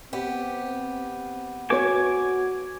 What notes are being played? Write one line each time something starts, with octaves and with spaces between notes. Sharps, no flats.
B3 C4 G4
F#4 B4 C#5 G#5 D6